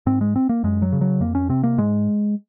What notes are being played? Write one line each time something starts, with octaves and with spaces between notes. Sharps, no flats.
G#2 C4
G#3
C4
A#3
F#2 G#3
F#3
C#3
F#3
F2 A#3
C#4
C3 C4
A#3
G#2 G#3